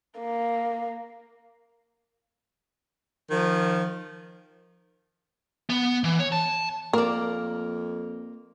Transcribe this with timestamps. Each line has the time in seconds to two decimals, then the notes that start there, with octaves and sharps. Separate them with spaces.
0.19 A#3
3.31 D#3 F3
5.70 B3
6.04 E3
6.19 C#5
6.32 A5
6.93 F2 A#3 A#4 D5